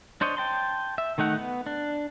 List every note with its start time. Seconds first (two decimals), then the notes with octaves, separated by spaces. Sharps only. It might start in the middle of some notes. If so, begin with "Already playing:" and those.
0.21 D4 C5 C#5 D#5
0.37 G5 A5 C6
0.98 E5
1.18 D#3 A3 D#4 F#5
1.38 B3
1.66 D4